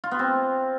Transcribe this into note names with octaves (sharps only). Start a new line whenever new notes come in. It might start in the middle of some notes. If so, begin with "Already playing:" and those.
F4
B3
C4